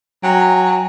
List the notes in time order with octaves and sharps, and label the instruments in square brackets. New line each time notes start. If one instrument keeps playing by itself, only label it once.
[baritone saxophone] F#3 [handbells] G5 G#5 A#5